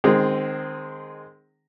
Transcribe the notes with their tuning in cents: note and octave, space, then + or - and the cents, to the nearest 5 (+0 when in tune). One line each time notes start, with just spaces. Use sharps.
D#3 -25 G#3 -10 C4 +0